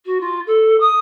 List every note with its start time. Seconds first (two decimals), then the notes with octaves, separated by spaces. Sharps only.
0.05 F#4
0.20 F4
0.46 A4
0.80 D#6